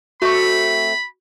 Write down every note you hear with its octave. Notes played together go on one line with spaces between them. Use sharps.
A3 C4 F#4 B5 C#6